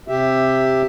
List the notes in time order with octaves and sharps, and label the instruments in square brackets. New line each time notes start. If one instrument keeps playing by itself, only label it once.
[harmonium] C3 G4 E5